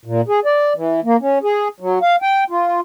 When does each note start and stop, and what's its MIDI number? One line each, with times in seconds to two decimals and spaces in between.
0.05 0.21 46
0.28 0.40 68
0.45 0.73 74
0.76 1.00 52
1.04 1.16 58
1.21 1.39 61
1.43 1.68 68
1.80 1.99 54
2.02 2.16 77
2.22 2.44 79
2.50 2.80 65